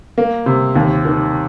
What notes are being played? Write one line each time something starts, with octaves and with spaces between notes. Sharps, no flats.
A#3
C3
D#2
D#3